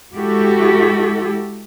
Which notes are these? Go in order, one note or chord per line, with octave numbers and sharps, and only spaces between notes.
G#3 E4 F#4 G4 A4